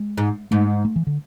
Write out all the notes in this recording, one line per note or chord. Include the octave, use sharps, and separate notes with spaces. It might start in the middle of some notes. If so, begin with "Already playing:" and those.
Already playing: G#3
G#2
G#2 A3
A3
E3
D3